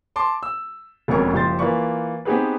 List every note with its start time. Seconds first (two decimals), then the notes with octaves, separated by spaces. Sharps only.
0.16 A5 C6 D6
0.43 E6
1.08 E1 F2 B2 C#4 A#4 C#6
1.33 F#1 F3 G4 C5 C6 A6
1.59 E3 A#3 F4 B4 D5 C#6
2.25 B3 C4 D#4 G4 G#4 B4